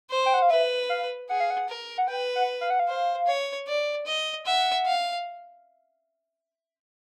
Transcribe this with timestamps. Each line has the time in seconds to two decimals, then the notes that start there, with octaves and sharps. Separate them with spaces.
0.10 C5
0.26 G5
0.34 F#5
0.42 F5
0.50 B4 E5
0.89 F5
1.29 G#4 F#5
1.40 F5
1.50 F#5
1.69 A#4
1.98 F#5
2.08 B4 G5
2.35 F#5
2.61 F5
2.70 F#5
2.80 F5
2.88 C5
3.27 C#5
3.67 D5
4.06 D#5
4.46 E5 F#5
4.86 F5